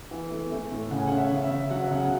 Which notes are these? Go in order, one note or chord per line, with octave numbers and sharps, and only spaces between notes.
E3
A3
A3
A2
C#3 F#5
G#5
F#5
C#4
E5
C#3
E5
C#3
F#3 F#5
E5
C#3 F#5